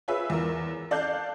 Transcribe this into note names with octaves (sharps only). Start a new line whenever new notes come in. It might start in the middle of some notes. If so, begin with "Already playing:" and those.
F4 G#4 B4 C#5 E5
E2 A#4
A4 D5 F5 A5 F#6 G6